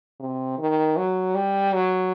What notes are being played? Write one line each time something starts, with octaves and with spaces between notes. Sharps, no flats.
C3
D#3
F#3
G3
F#3